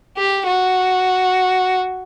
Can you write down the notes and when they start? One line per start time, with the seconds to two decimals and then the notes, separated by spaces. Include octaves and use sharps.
0.17 G4
0.47 F#4